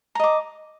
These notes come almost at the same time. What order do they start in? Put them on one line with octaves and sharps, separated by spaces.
A#5 D#5 D6